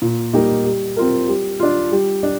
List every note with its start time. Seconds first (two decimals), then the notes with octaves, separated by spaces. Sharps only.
0.02 A#2
0.33 G3 A#3 D#4 G4
0.65 G3
0.96 C4 F4 A#4
1.28 G3
1.60 D4 F4
1.92 G3
2.23 D4